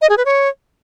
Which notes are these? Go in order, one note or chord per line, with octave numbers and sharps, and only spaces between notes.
D#5
G#4
B4
C#5